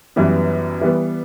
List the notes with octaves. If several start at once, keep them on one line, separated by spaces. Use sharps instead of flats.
F#2 E3 G3 B3
E3 G3 B3